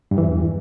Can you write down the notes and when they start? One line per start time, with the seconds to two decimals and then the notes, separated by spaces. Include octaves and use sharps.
0.11 G2
0.18 E3
0.25 E2